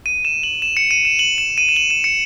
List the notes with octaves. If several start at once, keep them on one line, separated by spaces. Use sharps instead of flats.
D#7
E7
F#7
E7
C#7
D#7
E7
F#7
E7
D#7
E7
F#7
E7
C#7